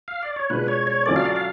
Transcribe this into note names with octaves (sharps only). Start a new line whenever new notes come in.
F5
D5
C#5
B2 G#3 D4 F4 B4
C#5
C#5
F#3 C#4 F4 A4 C#5 D5
F5
D5
F5